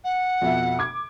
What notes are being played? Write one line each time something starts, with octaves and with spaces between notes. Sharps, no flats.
F#5
F2 B2 E5
D6 G#6